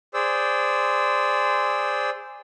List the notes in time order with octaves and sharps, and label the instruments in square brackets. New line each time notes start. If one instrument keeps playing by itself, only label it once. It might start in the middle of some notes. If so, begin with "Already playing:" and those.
[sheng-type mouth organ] G#4 C5 D5 E6